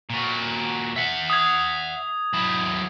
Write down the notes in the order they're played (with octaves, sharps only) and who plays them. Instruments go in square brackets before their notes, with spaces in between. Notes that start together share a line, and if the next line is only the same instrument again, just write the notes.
[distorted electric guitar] A#2 F#4
E5 F#5
[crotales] D#6 G#6
[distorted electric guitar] F#3 E4